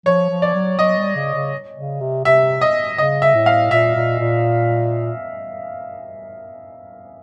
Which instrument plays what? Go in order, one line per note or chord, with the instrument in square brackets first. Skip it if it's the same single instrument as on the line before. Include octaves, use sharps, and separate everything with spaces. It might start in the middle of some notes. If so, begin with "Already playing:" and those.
[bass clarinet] F3 [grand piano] C#5
[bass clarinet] F3
[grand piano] D5
[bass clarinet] F#3
[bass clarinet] F#3 [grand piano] D#5
[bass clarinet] G3
C#3
C#3
C#3
C3
[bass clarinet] C3 [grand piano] E5
[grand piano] D#5
[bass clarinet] C#3 [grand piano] D#5
[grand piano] E5
[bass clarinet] A2
[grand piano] F5
[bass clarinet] A#2 [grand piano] E5
[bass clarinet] A#2
A#2